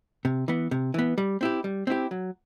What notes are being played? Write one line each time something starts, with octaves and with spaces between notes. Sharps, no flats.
C3
E3 B3
C3
E3 B3
G3
C4 E4 G4
G3
C4 E4 G4
F#3